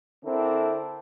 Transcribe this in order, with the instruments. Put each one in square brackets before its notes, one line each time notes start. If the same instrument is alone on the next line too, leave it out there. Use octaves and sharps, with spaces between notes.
[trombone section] D3 C4 D4 E4 A4 A#4